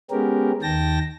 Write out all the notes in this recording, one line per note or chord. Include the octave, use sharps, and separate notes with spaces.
G#3 B3 C#4 G4 A#4
D#2 D#3 G5 A5 A#6